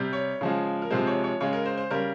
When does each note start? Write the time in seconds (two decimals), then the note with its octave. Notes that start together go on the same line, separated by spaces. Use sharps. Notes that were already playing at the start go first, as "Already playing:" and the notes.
Already playing: C3 G3
0.13 C#5
0.41 C#3 F3 G#3
0.82 A#4
0.90 C3 F3 G#3 C5
1.07 C#5
1.24 C#5
1.40 C#3 G#3 C#5
1.53 A#4
1.65 C5
1.77 C5
1.91 C#3 G3 A#4